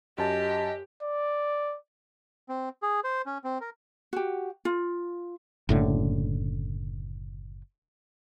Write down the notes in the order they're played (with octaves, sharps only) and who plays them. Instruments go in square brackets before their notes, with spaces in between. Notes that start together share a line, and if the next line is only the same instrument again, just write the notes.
[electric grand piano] F#2 G#5 A5 [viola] G4 [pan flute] D#5
[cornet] D5
[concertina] C4
G#4
C5
C#4
C4
A#4
[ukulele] F#4 G4
F4
[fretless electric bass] F#1 A2 D3